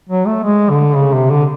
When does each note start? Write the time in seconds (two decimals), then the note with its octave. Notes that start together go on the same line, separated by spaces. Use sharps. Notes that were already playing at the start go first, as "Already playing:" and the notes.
0.09 F#3
0.27 A3
0.44 G#3
0.70 D3
0.96 C#3
1.13 C3
1.31 D3